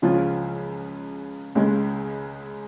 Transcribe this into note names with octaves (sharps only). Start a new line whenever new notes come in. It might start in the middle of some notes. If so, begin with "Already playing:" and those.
C#2 C#3 F3 C#4 F4
C#2 C#3 G#3